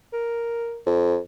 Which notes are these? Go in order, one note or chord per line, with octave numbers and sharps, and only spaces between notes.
A#4
F2